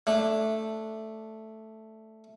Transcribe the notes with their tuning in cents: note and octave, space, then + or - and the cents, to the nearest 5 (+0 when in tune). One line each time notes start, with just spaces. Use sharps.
A3 +0 D4 +0